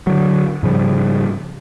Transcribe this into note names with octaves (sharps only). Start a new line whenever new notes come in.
D3 F#3
G#2 C#3 F3 G3